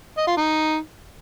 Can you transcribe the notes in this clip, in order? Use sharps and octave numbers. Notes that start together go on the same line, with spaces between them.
D#5
F4
D#4